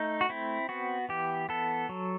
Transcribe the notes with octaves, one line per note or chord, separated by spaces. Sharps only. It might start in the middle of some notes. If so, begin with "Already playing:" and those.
Already playing: A3 D#4
F#4
C4 E4
B3 F#4
E3 G4
B3 A4
F#3